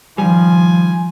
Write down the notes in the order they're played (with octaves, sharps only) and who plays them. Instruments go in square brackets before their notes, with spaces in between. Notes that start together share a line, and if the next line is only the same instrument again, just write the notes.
[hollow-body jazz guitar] D#3 G3 [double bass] F3 [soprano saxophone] G#5